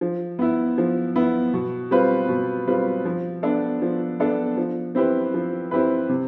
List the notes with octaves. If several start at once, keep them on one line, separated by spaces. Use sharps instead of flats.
F3
B3 E4
F3
B3 E4
B2
G3 C4 F4 B4
B2
G3 C4 F4 B4
F3
B3 D4 A4
F3
B3 D4 A4
F3
C4 E4 G4 B4
F3
C4 E4 G4 B4
C3